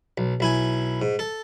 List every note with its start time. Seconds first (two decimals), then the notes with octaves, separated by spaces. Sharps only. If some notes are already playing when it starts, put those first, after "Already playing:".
0.18 B1
0.40 B1 E4 G#5
1.02 G#2
1.19 A4